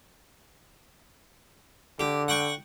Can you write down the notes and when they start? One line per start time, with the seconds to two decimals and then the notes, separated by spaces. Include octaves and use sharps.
2.00 D3 G4
2.28 F#5 G5 C#6